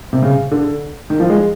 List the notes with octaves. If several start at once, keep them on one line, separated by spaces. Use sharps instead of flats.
C3
C#3
D3
D#3
F3
G#3